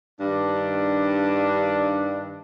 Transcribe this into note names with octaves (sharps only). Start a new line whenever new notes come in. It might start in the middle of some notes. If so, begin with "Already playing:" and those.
G2 D#3 D4